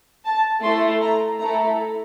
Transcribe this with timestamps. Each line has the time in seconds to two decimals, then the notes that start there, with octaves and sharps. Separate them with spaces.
0.25 A5
0.63 A3 E4 A4 C6
1.01 A#5
1.39 A3 E4 A4 A#5